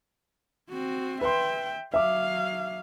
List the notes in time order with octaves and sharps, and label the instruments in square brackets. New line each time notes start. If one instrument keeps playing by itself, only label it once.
[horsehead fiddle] C4 F#4
[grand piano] B4 C6 [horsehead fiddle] E5 G5
[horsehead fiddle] F#3 F5 [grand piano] E5 D6